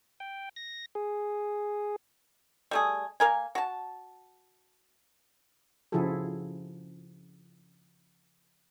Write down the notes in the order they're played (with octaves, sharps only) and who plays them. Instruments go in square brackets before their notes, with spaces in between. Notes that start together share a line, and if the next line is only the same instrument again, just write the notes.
[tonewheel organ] G5
A#6
G#4
[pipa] G3 A3 G#4
A#3 A#4 G#5
F#4 A5
[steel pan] C#3 F3 E4 F#4 G#4 A4